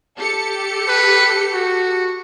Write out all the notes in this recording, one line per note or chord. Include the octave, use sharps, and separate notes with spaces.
G4 A4 C#7
B4
F#4